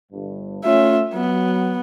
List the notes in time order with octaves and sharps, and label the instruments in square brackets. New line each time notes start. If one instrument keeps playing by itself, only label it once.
[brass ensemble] G1 G2
[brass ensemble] A3 C#4 [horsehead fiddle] F4 E5
[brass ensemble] F#3 [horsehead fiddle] B3